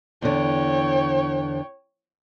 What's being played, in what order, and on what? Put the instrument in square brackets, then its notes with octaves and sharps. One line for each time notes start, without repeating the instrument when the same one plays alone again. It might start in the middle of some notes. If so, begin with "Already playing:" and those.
[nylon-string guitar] E2 D3 [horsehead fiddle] C#5 G5